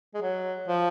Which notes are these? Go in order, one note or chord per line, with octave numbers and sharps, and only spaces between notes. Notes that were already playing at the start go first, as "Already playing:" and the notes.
G#3
F#3
F3